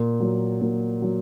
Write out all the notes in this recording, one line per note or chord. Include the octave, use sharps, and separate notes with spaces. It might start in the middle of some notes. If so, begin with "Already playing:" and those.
Already playing: A#2
F#3
A#2
F#3